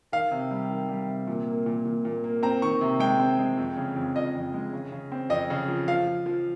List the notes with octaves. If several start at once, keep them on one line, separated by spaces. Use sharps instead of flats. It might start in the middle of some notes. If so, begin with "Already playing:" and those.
D#3 F5
C3
G3
D#3
G3
C3
A#2
A#3
A#2
A#2
A#2
A#3
C4 A#5
D#3 C#6
C3
G#3 G5
C4
G#3
F2
C#3
F2
F3 D#5
F2
G#3
C#3
C#3
C4
F2 D#5
C#3
F3
F3 F5
F3
F3